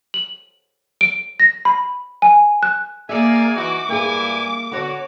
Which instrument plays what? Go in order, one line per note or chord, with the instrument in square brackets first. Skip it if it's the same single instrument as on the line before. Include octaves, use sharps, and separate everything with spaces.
[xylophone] F#7
D7
A#6
B5
G#5
F#6
[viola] A#3 [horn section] G#4 D5 G#5 [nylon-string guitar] E5
[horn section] E3 D#4 F#4 [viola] D6
[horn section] G2 E4 G#5 [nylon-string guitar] A#3 G#4
[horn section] D3 F#4 [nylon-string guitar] B3 C#5